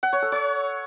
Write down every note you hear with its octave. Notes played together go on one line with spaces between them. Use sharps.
F#5
C#5
A4
C#5